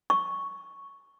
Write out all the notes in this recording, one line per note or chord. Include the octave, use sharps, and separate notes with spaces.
C#6